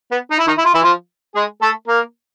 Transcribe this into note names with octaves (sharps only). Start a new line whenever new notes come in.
B3
D#4
E4
D#3 D#4
E4
F4
E3 E4
F3 F4
G#3 G#4
A3 A4
A#3 A#4